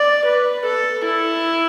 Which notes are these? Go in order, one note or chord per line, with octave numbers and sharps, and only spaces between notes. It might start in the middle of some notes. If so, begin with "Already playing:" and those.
Already playing: D5
B4
A4
E4